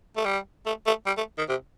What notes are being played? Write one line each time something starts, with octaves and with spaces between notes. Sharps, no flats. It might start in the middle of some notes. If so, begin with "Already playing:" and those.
A3
G3
A3
A3
G3
A3
D#3
C3